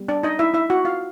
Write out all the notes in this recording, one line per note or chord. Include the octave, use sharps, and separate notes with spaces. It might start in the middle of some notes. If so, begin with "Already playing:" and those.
Already playing: G3 B3
D4 D5
D#4 D#5
E4 E5
E4 E5
F#4 F#5
F4 F5